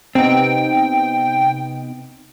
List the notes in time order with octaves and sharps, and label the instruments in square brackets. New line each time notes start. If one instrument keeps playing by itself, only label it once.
[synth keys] C3 B3 D#4 [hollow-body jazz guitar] C4 [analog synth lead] G5